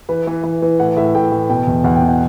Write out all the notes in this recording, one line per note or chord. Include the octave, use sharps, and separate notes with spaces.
E3 B4
E3
E3
E3
A2 F#5
A2 E5
A2 G5
E3
B2 G5
E2
E2 F#5
G5
B2
F#5